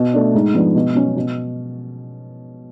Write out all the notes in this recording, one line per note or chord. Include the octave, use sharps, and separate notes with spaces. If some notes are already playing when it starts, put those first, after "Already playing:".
Already playing: B2
A3 D4
G#2
F3 B3 D4
B2
F#3 C#4
B2